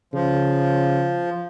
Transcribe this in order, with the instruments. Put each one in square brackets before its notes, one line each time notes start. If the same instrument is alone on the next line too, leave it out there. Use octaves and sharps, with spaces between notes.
[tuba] C#3 [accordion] F3